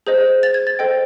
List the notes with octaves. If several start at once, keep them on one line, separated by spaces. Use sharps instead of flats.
G#4 C5 D#5
A6
G#6
A6
A4 C5 D#5 G5